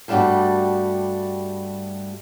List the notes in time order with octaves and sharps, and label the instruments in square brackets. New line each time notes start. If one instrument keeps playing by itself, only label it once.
[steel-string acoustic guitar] G2 G3 A3 D4 F#4 G4